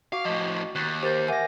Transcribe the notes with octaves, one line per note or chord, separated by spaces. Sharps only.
F#4 F5 D6
A2 F3 D#5
D#2 F#6 A6
G4 A#4 C5 G6 A6
A#4 E5 F#5 G#5 D6 A#6